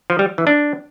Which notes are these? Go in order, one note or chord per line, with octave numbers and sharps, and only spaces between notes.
F3
G3
E3
D4